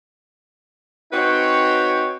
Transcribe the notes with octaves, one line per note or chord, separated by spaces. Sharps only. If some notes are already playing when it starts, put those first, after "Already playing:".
C4 D#4 F#4 B4 C#5 G5